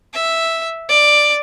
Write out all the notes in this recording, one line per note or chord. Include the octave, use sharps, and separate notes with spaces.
E5
D5